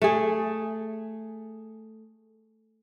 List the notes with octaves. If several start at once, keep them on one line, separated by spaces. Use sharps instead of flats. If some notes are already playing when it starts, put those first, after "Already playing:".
A3 G#4